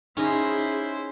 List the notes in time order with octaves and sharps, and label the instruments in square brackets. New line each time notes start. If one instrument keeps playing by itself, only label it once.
[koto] C#4 D#5 [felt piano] D#4 [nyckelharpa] E4 C5 [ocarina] G#4